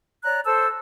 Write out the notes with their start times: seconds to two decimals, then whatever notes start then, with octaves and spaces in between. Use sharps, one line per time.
0.24 C#5 D5 A#5 F#6
0.44 A4 C5 A5 E6